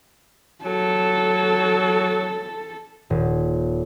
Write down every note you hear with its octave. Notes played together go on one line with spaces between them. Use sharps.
F#3 A4
D#1